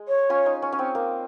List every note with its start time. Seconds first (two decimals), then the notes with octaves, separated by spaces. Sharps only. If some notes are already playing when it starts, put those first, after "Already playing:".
Already playing: G#3
0.08 C#5
0.30 C#4 F4
0.46 D#4
0.62 C#4
0.72 C#4
0.79 C4
0.95 A#3